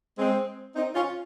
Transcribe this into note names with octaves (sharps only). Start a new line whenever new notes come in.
G#3 C4
C4 D#4
C#4 F4